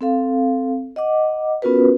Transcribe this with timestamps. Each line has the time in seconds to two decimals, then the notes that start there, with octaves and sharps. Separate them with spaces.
0.01 C4 A4 F5
0.96 D#5 F#5 D6
1.62 B3 C#4 F4 F#4 A#4 B4